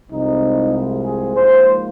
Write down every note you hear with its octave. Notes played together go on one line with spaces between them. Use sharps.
C2 C3 F3 G#3 C4 D#4
G#4
G#2 F3 A#3 C5